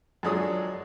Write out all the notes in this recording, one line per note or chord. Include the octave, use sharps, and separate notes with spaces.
F#2 A#2 G#3 D4 C#5 D#6